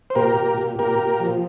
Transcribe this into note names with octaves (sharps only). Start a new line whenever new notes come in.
C5
A#2 G4 A#4
A#2
A#2
A#2 G4 A#4
A#2
F3